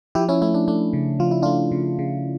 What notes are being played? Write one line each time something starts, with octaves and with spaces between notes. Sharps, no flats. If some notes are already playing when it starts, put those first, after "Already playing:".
F3 E4 G4
C#4 E4
A3 C#4 E4
D4
A3 D4
C#3
F3 F4
E4
A3 D4 F4
C#3
C#3